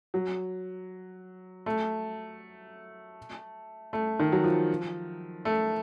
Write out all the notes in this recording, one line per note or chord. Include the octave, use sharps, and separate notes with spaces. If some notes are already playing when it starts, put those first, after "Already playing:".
F#3
A3
A3
D#3
F#3
F3
A3